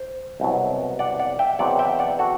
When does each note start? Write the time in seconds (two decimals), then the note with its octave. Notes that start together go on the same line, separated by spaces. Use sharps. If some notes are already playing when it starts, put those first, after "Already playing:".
Already playing: C5
0.40 C2 B2 F#3
0.99 D5 F#5
1.19 D5 F#5
1.39 E5 G5
1.59 E2 B2 F#3 C4 D5 F#5
1.79 E5 G5
1.90 G5
1.99 D5 F#5
2.19 F#4 A4